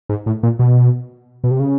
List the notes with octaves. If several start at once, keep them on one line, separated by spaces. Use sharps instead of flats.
G#2
A2
A#2
B2
B2
C3
C#3